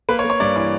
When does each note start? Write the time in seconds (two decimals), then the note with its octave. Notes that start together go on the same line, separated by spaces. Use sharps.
0.09 A#3 B4
0.19 C#5
0.24 A#3
0.30 C#5
0.40 G2 D5
0.56 E3 D5